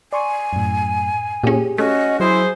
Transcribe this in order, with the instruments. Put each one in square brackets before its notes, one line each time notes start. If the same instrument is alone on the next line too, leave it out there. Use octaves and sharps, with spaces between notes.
[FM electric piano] D5 C6 C#6 [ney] G#5
[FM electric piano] F#2 A2
[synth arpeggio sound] A#2 C#4 [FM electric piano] G4 G#4
[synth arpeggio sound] A3 [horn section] C#4 F#4 [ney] D#5
[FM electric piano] F#3 [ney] E4 [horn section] G#4 C5